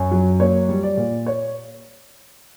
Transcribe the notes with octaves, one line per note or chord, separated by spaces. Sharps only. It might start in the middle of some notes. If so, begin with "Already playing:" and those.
Already playing: F#2 C#5
F#3
A#3 C#5
G3
D5
A#2
C#5